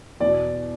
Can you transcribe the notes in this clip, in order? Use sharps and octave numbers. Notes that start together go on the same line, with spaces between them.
E2 B2 D5